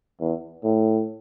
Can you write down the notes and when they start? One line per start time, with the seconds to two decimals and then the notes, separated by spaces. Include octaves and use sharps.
0.20 E2
0.64 A2